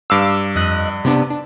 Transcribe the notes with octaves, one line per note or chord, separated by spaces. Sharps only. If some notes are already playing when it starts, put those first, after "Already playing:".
G2 F5 D6 E6
F2 D#5 F#6
C3 B3 D4
D4